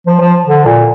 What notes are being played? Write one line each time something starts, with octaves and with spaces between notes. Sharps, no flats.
F3
F3
D3
A#2